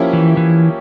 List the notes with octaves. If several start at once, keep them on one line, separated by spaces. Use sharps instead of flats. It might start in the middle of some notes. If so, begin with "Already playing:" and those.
Already playing: F3 A#3 C#4 E4 G4
E3
E3